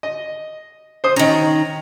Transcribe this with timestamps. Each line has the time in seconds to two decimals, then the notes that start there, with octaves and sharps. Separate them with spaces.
0.03 D#5
1.04 C5 D#6
1.16 D#3 C#4 A#5